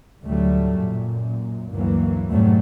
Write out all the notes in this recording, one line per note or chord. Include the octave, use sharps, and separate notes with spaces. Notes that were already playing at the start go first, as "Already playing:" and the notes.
D2 A2 F#3 G3 A3
F#2 A#2
D2 G2 E3 F#3 A#3
F2 G#2 B2 F#3 G3 A3